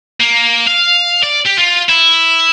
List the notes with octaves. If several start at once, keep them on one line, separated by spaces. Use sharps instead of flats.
A#3
F5
D5
G4
F4
E4